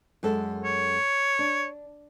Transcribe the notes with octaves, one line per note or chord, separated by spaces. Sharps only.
F#2 G#3 A4
C#5
D4